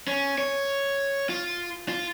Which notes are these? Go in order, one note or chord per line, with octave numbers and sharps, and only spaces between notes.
C#4
C#5
F4
F4